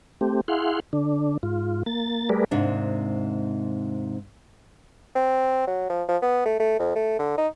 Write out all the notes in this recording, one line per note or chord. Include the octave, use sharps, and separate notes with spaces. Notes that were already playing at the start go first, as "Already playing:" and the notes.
A3 C4 G4
E4 G#4 F5 F#5 C6
D3 D4
G#2 F4
A#3 A6
G3 A3 G#4 A#4 B4 D5
D#2 G#2 C3 D4
C4
F#3
F3
F3
B3
A3
A3
F2
A3
D3
D#4